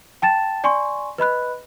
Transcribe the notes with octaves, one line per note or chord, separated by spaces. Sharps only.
G5 A5 A6 E7
D5 G#5 C6 C#6
B4 D#5 B5 F#6